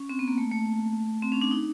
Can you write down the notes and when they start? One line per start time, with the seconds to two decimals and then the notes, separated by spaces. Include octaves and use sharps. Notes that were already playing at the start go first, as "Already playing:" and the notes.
Already playing: C#4
0.09 C4
0.19 B3
0.28 A#3
0.38 A3
0.52 A3
1.22 C4
1.32 C#4
1.42 D4
1.51 D#4